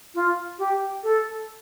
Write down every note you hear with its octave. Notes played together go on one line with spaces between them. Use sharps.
F4
G4
A4